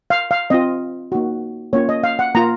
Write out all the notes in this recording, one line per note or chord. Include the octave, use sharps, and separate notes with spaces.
F5
F5
C4 F4 D#5
A#3 D#4 F#4
A#3 C#4 F4 C#5
D#5
F5
F#5
A#3 F4 A#5